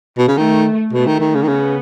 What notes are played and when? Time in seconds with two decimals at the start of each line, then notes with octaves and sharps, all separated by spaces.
0.18 B2
0.28 C#3
0.37 D#3 A3
0.93 B2 A3
1.07 D#3
1.20 D#3
1.35 C#3
1.43 D#3
1.48 C#3 B3